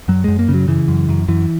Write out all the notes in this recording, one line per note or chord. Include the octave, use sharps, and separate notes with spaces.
F#2 F#3
F#2 G#3
A#3
C#3
F#3
C#3 E3
F#2
F#2
F#2 E3